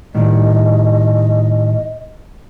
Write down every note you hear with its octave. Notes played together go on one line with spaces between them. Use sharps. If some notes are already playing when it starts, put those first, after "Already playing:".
A2 D#3 G3 D#5